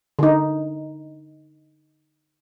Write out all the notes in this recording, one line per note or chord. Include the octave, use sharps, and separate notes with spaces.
D3 D#4